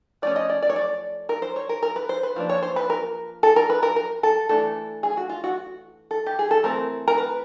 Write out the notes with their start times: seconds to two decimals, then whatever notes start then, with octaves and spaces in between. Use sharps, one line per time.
0.22 F3 A3 C#4 D5
0.36 D#5
0.50 D5
0.62 D5
0.70 C#5
0.76 D5
1.29 A#4
1.42 C5
1.56 C#5
1.69 A#4
1.83 A#4
1.96 B4
2.09 C5
2.23 B4
2.36 F3 A#3 D4
2.49 C#5
2.62 C5
2.76 B4
2.90 A#4
3.43 A4
3.56 A#4
3.70 B4
3.83 A#4
3.96 A#4
4.23 A4
4.49 E3 A3 D4 A4
5.03 G#4
5.17 F#4
5.29 F4
5.44 F#4
6.11 A4
6.26 G4
6.39 G#4
6.51 A4
6.63 E3 A3 C4 A#4
7.08 A#4
7.17 B4